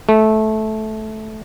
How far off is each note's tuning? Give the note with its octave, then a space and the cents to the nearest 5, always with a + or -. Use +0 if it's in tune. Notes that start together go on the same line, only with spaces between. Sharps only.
A3 -15